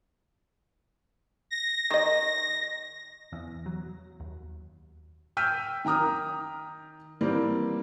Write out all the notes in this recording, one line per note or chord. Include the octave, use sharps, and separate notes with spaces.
A#6
D#3 D#5
E2
F#3
D#2
G5 E6 F6 G6 B6 D#7
D#3 G5 A#5 D#6 F6
D#3 E3 G3 A#3 C4